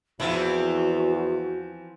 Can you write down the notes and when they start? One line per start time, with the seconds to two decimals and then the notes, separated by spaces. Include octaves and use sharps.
0.20 E2 E3 F3 C4 E4 F#4